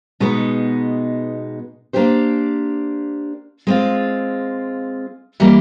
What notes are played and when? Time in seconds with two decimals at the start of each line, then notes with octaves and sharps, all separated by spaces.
0.20 B2 G#3 B3 D#4
1.93 A#3 D4 G4 C5
3.67 G#3 C4 F4
5.40 E3 G3 A#3